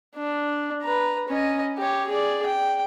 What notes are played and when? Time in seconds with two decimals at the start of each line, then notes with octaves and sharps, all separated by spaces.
0.15 D4
0.82 B4 A#5
1.29 C#4 D#5
1.78 G4 C#5
2.07 G#4 D5
2.46 G5